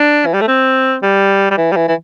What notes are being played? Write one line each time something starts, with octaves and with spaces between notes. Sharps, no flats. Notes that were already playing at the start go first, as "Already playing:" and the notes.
Already playing: D4
E3
G3
A3
C4
G3
G3
E3
G3
E3
E3